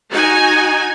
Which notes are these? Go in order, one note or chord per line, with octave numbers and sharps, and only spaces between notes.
D#4 F#4 G#5